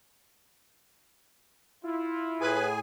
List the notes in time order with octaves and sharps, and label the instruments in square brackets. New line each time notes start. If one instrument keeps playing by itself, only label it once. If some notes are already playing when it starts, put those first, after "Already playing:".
[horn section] E4 F4
[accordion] A2 G#4 G#5 [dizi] B4